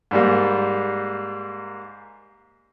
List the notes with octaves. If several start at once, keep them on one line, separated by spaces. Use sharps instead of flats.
G#2 G3 A#3